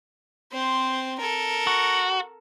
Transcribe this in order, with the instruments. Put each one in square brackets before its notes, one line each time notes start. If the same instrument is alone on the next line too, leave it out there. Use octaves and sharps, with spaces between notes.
[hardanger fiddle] C4 C5
A4 A#4
[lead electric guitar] F#4